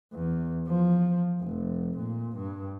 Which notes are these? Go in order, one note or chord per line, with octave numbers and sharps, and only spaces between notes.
E2
F3
F1
A#2
G2